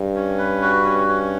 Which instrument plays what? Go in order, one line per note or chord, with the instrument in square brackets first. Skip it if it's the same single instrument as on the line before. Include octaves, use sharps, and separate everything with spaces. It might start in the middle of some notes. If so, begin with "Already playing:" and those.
Already playing: [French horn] G2
[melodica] C#4
B4
F#4
C#4
C#4